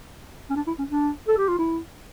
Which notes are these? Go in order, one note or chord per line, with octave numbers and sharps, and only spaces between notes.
C#4
D4
E4
C#4
D4
A4
G4
F4
E4